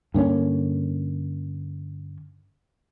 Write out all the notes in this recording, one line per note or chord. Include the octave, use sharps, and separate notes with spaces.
G2 D3 A#3 C#4